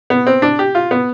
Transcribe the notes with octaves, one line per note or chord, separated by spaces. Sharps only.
B3
C4
D4
G4
F4
B3